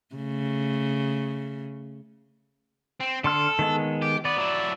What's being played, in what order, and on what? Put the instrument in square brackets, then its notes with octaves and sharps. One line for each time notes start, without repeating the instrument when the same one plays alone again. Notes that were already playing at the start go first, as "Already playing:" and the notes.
[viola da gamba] C#3 A3
[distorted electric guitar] C4
[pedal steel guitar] D3 C6 F6 [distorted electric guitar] A4
[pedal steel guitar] D#3 G#3 B3
[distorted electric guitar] G4
[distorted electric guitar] B3 [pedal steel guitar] D5
[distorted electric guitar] F#3 E4